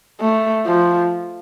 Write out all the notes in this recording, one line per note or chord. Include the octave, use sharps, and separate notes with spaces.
A3
F3